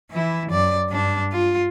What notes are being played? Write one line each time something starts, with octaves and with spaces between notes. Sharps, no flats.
E3 E4
F#2 D5
G2 D4
F4